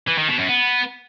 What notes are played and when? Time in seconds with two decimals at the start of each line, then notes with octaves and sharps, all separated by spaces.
0.08 E3
0.18 D#3
0.29 B2
0.39 F#2
0.49 B3